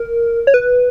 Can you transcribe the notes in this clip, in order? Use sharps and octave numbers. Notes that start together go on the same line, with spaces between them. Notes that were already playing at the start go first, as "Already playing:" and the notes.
Already playing: A#4
C#5
B4